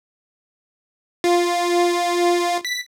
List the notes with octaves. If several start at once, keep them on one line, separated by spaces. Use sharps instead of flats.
F4
B6